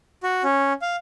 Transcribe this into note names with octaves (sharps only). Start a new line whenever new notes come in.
F#4
C#4
F5